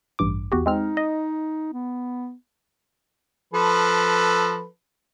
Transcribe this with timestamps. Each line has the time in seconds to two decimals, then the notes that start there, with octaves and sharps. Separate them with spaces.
0.19 A1 G2 D6
0.52 E2 F#4 G4
0.66 G#3 C4 D#4 F6
0.97 D#5
1.73 B3
3.54 F3 A4 B4